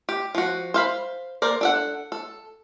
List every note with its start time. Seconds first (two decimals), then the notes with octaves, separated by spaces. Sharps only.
0.09 G4
0.35 F3 F#4
0.74 C5 F5 B5
1.42 A#3 A#4 C5 D5
1.61 D4 A4 F#5
2.12 A4